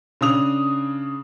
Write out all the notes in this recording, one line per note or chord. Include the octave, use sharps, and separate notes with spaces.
C#3 D4 D#6 F7